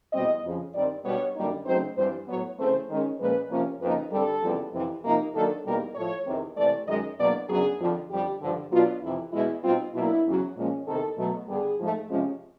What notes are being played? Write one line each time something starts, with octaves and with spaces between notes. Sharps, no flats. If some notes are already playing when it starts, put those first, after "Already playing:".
E2 B2 G3 C4 D#5
F2 C#3 F3
G2 D#3 G3 C4 D5
B2 G3 B3 D4 C#5
F#2 D3 G3 A#3 D#4
C#3 F#3 A3 C4 D#4 C5
G2 E3 G3 C4 C5
A2 F#3 B3 C#5
C#3 E3 A3 C4 C5
D#3 G#3 C#4
A#2 F3 G#3 C#4 B4
C3 F3 A#3 C#4
F2 C#3 F3 A#3 D#4 B4
G2 D3 G3 C4 A4
F2 C#3 E3 G3 B3
F2 C3 E3
C3 F3 A#3 D#4
D#3 F#3 A#3 D4 A4
E2 B2 G3 A#3 D#4 A#4
A2 F3 A3 C#5
E2 C3 D#3
C3 E3 A3 D5
F#2 D#3 G#3 D#5
E2 B2 F#3 A#3 D4 D5
F#2 C#3 F#3 B3 D4 G#4
F2 D3 F3
F2 D3 G3 G4
G2 D3 F3
B2 F#3 B3 D4 F4
F2 C3 E3 E4
E2 B2 G#3 E4
B2 G3 C4 D#4 F4
B2 F#3 A#3 D4 E4
E2 C#3 F#3
A#2 F3 G#3 C#4
E2 C3 D#3 A4
B2 F#3 A3
G2 D3 G3 B3 G#4
G#2 F3 A3
C3 F3 G#3 C#4